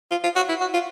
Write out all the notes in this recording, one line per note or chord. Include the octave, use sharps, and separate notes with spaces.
F4
F4
F#4
E4
F#4
F4